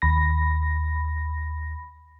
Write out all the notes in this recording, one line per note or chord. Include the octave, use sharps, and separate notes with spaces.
D#2 B5 A#6